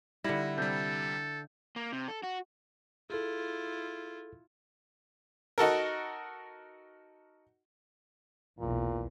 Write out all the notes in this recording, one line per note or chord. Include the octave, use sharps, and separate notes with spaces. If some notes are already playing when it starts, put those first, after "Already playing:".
D3 G3 E4 A#6
C3 G3 A4 G6
A#3
C3
A4
F#4
E4 F4 G#4 A4
D#4 F#4 A4 A#4
B1 E2 A#2